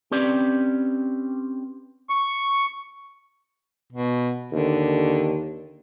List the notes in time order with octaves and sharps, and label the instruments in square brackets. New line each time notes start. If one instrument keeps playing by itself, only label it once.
[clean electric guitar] C4 C#4 G4 B4 D5
[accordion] C#6
[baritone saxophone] B2
[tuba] D#2 [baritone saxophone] D3